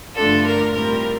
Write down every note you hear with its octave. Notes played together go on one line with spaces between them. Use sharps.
G2 D3 A3 D4 F4 A4
A#4
A2 G3 C4 F4 A#4